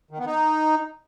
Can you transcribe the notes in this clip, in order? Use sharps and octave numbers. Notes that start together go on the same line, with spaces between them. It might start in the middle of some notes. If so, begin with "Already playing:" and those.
D#3
B3
D#4